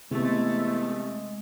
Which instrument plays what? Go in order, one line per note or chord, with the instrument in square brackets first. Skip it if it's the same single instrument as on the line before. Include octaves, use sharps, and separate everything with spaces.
[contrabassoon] E2 [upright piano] C3 [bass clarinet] G#3 [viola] A3